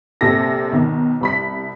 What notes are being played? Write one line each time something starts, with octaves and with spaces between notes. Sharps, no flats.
A#1 C3 A4 A#6
B1 D#3
C2 B5 B6